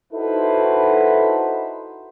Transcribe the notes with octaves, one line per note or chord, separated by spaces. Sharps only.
D#4 E4 F#4 A4 B4 C5